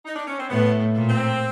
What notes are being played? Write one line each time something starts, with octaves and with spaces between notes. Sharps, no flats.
D#4
D4
C#4
C4
A2 B3
A#2
C4